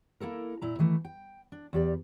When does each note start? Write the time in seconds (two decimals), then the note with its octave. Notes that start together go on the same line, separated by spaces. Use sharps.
0.20 A#3 E4 A4 A#4
0.62 A#2 E4 A#5
0.79 D#3 E3 A3
1.05 G5
1.52 D4
1.73 E2 G4 D5